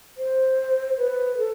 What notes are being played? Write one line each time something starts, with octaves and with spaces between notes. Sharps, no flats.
C5
B4
A4